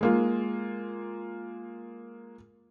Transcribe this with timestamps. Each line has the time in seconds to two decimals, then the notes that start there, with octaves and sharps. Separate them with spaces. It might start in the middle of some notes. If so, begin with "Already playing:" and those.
0.01 G#3 A#3 F4